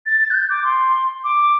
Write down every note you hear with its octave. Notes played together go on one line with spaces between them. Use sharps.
A6
A6
F#6
G6
D6
C6
D6